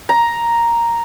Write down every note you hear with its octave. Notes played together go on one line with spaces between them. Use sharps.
A#5